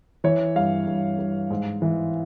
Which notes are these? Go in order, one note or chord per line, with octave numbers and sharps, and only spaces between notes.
E3 C#5
G2 F5
G2
G2
G#2
E3